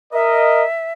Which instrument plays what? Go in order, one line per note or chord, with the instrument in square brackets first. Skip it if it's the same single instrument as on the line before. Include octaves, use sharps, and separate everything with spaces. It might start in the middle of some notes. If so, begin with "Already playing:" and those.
[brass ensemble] A#4 D#5 [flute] E5